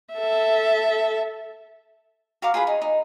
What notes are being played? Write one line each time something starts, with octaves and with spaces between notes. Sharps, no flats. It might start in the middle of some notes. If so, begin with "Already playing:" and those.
A4 E5
F#4 F5 A#5 D6
F4 G#4 B4 B5
D#4 G#4
D#4